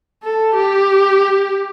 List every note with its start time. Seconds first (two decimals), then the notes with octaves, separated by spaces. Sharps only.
0.23 A4
0.55 G4